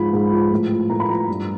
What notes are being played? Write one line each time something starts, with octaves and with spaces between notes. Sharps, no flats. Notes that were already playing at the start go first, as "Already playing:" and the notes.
Already playing: G#2 F3 B5
G#2
F3
A2
F3
A2 A#5
B5
F3 A#5
G2